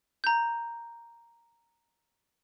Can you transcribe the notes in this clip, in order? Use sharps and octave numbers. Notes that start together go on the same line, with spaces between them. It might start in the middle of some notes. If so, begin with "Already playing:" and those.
A#5 G6